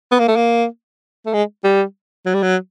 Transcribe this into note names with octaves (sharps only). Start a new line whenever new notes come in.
B3
A#3
A3
A#3
A3
G#3
G3
F#3
G3
F#3